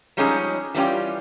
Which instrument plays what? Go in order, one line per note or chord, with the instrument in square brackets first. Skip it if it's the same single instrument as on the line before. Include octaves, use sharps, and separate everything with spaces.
[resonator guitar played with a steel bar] F3 G3 G#3 C#4 D#4 G#4
E3 G3 C#4 F4 G4